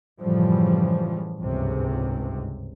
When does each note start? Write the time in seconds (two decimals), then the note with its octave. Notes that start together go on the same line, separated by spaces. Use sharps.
0.20 F#2 A2 C#3 E3 F3 G3
1.39 G1 C#2 G#2 C3